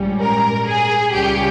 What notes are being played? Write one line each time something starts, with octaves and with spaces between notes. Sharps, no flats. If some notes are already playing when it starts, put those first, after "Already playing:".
Already playing: A#1 G#2 G3 C#4
A#4
G#4
C#2 C#3 G3 C#4 G4